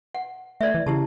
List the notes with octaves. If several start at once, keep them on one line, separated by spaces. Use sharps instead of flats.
F#5
A3 D5 E5
E3
C#3 E4 G4 A5